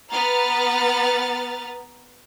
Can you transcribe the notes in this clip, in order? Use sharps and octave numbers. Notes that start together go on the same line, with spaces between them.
B3 B4 A#5 F6 A6